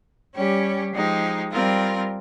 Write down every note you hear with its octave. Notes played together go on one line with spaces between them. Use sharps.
G3 C#4 G4 C#5
F3 G#3 D#4 G4
G3 C4 F4 A#4